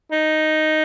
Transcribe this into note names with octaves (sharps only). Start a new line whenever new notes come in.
D#4